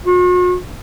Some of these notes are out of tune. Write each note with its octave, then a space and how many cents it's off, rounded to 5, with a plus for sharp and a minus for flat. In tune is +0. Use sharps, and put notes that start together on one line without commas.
F#4 -45